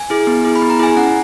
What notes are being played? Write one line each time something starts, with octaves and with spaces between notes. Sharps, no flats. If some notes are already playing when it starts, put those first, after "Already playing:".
Already playing: G#5
E4 G#4
B3
E4 G#4
B5
B3
A#5
E4 G#4 G#5
C#4 F#5